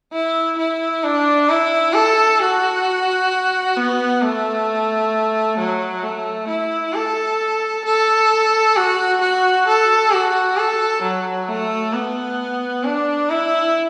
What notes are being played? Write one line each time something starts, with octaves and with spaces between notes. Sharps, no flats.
E4
E4
D4
E4
A4
F#4
B3
A3
F#3
A3
E4
A4
A4
F#4
F#4
A4
F#4
A4
F#3
A3
B3
D4
E4